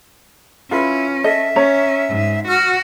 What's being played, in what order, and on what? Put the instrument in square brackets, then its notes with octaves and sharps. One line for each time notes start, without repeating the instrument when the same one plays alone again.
[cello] C#4 [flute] E4 [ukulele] F4 B4
[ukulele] A4 D#5 [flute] E5
[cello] C#4 [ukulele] C#5 A#5
[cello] G#2
[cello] F#4 [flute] F6